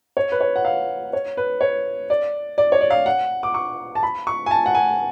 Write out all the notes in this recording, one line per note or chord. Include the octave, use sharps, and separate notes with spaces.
C#5
B4
C#5
F#5
F5
C#5
B4
C#5
D5
D5
C#5
D5
F5
F#5
D6
C#6
A5
B5
C#6
G#5
A5
F#5
G#5